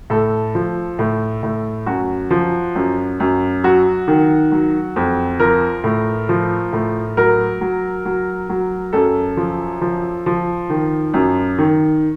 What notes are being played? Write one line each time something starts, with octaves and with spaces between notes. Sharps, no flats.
A2 A4
F3
A2
A2
F#2 F#4
F3
F#2
F#2
F#3 F#4
D#3
F#3
F2
F3 A#4
A2
F3
A2
F#3 A#4
F#3
F#3
F#3
F#2 A4
F3
F3
F3
D#3
F#2
D#3